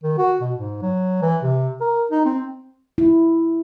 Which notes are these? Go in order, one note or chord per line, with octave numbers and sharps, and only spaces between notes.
D#3
F#4
B2
G#2
F#3
E3
C3
A#4
D#4
C4
E4